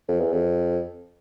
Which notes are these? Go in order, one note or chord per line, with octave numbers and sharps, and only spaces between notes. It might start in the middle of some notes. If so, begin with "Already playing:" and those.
F2
E2
F2